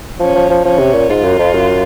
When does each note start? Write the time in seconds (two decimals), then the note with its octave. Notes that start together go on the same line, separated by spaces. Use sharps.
0.20 F3 C#4
0.35 F3
0.50 F3
0.65 F3 C#4
0.79 C3
0.94 A#2
1.09 G#2 F4
1.24 F#2
1.39 F2
1.54 F#2